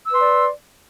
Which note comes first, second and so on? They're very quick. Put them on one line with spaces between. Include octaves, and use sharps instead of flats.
E6 B4 C6 D5